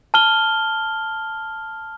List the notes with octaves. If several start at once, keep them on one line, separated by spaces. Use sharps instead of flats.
A5 F6 G7